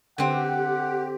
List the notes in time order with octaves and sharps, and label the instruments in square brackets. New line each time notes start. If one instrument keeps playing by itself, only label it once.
[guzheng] D3 C4 [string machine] G4 [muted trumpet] F#5